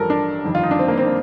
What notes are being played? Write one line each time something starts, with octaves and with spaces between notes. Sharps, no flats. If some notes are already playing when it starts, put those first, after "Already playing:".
Already playing: A1 G2 F3 A4 A#4
D4
G1 F2 D#3
F4
D#4
D4
C4
A#3
C4
D4